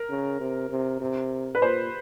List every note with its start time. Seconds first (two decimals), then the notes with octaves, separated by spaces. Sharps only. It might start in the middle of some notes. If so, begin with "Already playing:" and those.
Already playing: A#4
0.09 C#3
0.40 C3
0.70 C3
1.01 C3
1.55 B4
1.61 A#2 C5